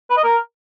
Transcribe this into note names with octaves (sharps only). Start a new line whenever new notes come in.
B4
D#5
A#4